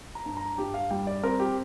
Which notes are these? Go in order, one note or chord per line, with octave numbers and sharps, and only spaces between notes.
A#5
G2
A#5
G2 G4
F5
G3 G5
D5
C4 A#4
G4